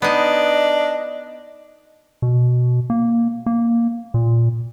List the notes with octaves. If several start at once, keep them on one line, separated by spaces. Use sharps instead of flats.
B3 D4 D#4 D#5
B2
A#3
A#3
A#2